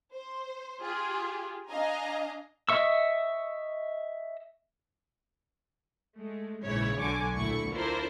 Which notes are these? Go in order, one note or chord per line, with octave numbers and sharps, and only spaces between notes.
C5
F4 G4 G#4
D4 D#5 F5 G#5 A#5
D#5 E5 C#6 E6
G#3 A3
A#1 G#2 C#3 E3 E4 C#5
B1 D3 F#3 G#5 C#6 D6
D2 A#2 A3 E4 C#6
D4 E4 F4 A4 A#4 C5